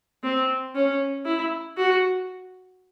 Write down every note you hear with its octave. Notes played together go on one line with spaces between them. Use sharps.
C4
C#4
E4
F#4